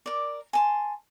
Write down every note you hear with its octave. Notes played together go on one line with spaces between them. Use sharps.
A#4 D5
G#5 A5 C6